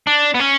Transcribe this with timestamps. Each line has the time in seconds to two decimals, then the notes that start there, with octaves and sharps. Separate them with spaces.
0.07 D4
0.34 B3
0.40 C#4